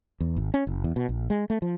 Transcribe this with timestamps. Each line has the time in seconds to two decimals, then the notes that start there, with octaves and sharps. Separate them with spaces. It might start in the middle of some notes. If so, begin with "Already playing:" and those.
0.20 E2
0.37 G#1
0.54 C#4
0.67 F#1
0.84 E2
0.96 B2
1.09 A#1
1.30 G#3
1.50 A3
1.62 F3